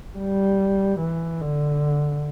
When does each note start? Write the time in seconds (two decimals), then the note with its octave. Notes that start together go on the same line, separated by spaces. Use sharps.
0.18 G3
1.01 E3
1.41 D3